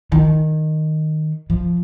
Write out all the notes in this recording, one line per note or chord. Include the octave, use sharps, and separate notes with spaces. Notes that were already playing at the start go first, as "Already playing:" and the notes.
D#3
F3